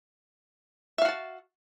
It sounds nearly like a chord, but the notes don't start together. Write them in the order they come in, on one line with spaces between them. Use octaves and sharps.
E5 F5 F#4 A5